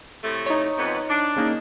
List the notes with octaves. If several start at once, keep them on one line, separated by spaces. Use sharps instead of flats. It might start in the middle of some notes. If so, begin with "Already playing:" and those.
A2 C3 A3
D#4 C#5
F2 B3
D4
C#3 A#3 D#4